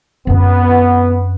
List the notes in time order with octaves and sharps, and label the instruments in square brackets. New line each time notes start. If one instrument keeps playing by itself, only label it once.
[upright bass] F#2 C4 [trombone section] B3